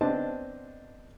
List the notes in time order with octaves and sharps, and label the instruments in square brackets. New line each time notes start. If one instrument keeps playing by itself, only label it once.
[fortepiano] B3 C4 D4 D#5 A5